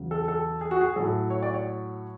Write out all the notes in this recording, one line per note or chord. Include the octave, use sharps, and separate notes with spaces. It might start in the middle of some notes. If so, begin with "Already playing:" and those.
Already playing: E2 C#3 F#3
A4
A4
G#4
F#4
G#4
A2 F#3 A4
C#5
D5
C#5